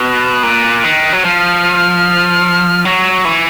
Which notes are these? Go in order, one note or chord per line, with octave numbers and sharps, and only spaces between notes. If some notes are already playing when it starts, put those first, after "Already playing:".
Already playing: B2 F#6
A#2
D#3
F#3
F3 F6
F#3 C#6
C#6
E3